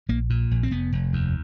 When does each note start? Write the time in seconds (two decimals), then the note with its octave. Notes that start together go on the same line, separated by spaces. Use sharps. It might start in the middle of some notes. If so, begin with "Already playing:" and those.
0.09 A#1 A#3
0.30 A#2
0.51 A#1
0.63 C4
0.71 F1 B3
0.93 F1
1.13 D#2